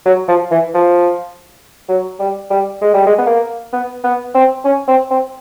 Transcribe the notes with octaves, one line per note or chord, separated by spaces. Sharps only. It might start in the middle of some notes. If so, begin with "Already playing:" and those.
F#3
F3
E3
F3
F#3
G3
G3
G#3
G3
G#3
B3
A#3
B3
B3
C4
C#4
C4
C4